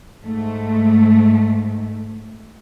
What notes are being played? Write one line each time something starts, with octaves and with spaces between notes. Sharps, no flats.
G#2 A3